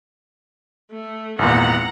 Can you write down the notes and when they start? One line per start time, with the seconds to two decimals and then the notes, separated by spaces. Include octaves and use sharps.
0.91 A3
1.39 G#1 E2 A#2 F#5 A#5